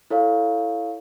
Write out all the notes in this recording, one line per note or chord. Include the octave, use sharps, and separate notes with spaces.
E4 A4 C#5 F5